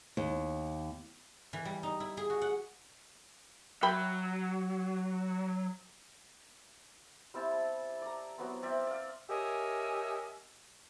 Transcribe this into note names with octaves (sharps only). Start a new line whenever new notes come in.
D#2
E3
G3
D#4
E4
G#4
F#4
F#5
F#3 E5 G5 B5
G3 C4 E4 A5
D5 A#5
F#3 B3 C4
C4 D5 E5 F5
D5 F5
G4 A#4 C#5 D#5 E5 G#5